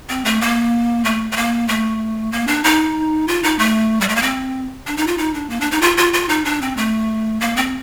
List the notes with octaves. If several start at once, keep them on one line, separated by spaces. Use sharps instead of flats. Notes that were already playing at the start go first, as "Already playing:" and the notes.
C4
A3
A#3
A3
A3
A#3
A3
A#3
D4
D#4
F4
D#4
A3
G3
A3
A#3
C4
D4
D#4
F4
D#4
D4
A#3
D4
D#4
F4
F4
F4
D#4
D4
C4
A3
A#3
C4